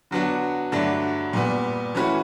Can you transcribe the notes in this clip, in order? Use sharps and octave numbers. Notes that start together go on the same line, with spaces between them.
D3 F#3 B3 D4 F#4
G2 D3 F#3 A3 D4
A#2 G3 B3
E3 A3 C#4 F#4 B4